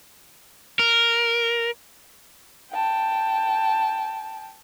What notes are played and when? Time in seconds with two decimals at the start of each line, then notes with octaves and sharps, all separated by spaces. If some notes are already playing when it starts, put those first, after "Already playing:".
0.79 A#4
2.71 G5 A5